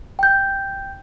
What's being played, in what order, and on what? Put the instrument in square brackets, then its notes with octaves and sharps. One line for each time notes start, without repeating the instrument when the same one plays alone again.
[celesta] G5 G6